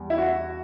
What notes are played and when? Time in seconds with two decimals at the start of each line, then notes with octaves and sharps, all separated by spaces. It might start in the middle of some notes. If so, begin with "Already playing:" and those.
Already playing: E2 G3
0.10 E4
0.18 F#4